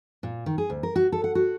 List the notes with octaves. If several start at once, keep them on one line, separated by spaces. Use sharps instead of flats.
A#2
D#3
G#4
D2
A#4
F#4
A4
F#5
F#4